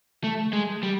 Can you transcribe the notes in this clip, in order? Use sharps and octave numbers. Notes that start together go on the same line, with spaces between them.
A3
G#3
G3